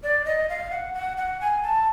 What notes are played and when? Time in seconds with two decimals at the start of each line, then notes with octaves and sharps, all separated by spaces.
0.03 D5
0.25 D#5
0.49 F5
0.71 F#5
0.94 F#5
1.17 F#5
1.41 G#5
1.63 A5